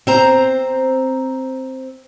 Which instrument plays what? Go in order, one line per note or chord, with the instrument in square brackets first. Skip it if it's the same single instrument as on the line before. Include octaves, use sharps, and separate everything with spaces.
[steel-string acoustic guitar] C4 C5 A#5